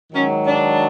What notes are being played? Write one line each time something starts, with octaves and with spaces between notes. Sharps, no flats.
G#2 D#3 F#3 C#4
D4